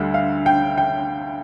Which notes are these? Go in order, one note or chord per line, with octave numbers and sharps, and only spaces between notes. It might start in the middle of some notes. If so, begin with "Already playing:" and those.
Already playing: D2 D3 G3 E5
F5
G5
G5